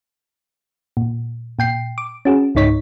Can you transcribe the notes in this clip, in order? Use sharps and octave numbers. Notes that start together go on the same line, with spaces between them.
A#2
A#2 G5 C7
D6
C#4 F#4 G#4
C#2 G#2 D#4 C#5 B6